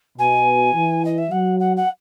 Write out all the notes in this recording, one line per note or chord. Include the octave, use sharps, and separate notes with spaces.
B2 G#5
E3
D#5
E5
F#3 F#5
F#5
F#5